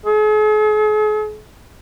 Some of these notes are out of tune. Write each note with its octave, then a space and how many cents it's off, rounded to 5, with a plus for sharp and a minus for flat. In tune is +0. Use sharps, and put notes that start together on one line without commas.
G#4 +45